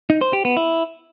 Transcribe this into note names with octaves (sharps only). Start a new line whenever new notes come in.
D#4
C5
G4
B3
E4